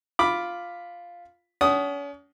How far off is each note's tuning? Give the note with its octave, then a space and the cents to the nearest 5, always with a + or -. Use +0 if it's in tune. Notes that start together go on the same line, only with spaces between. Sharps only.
F4 +0 B5 +0 D6 +0
C#4 +40 F#5 +40 D#6 +0